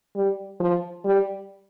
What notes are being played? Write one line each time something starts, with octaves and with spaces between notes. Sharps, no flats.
G3
F3
G3